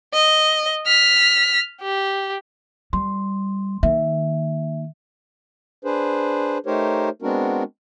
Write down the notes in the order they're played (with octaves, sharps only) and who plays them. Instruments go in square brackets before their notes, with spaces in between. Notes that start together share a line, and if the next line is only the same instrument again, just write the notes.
[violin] D#5
F6 B6
G4
[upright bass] G3 [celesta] C6
[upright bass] D#3 A#3 [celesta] E5
[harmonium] D4 G#4 B4 C5
A3 D#4 G4 A#4 C5 C#5
G#3 B3 C4 D4 F#4 A#4